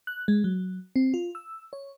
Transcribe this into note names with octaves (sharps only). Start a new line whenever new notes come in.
F#6
G#3
F#3
C4
F4
E6
C#5